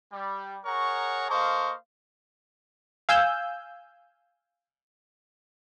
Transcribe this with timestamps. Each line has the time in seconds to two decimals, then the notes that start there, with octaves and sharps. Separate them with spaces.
0.13 G3
0.65 G#4 A#4 C#5 F#5 A#5 C#6
1.31 A#3 A4 C5 D#5 F5 C#6
3.09 F5 G#5 E6 G6